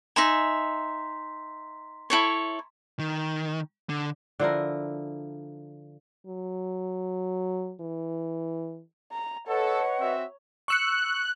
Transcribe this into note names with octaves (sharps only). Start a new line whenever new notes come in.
D#4 E5 G#5 A#5 C6 B6
E4 A4 C#5
D#3
D3
D3 F3 E4 A#4
F#3
E3
A#5
A4 B4 C#5 D#5 F#5
C4 F#4 E5
C#6 E6 F#6 C#7